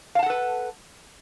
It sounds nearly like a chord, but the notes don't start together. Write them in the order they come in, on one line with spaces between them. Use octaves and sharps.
F5 A5 F#5 A4 B4